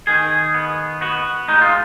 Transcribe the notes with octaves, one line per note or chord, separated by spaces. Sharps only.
D#3 G#4
B3
B3 F#4
G#3 D#4
F4